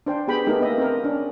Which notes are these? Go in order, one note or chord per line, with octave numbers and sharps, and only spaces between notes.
D4 C5 G5
B3 G4 G#4 G5 B5
A3 B3 D#4 G4 A4 A#4
A#3 D#5 E5
C4 A#4
C#4 D4